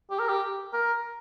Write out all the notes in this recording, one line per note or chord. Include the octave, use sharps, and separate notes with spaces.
G4
A#4
G4
A#4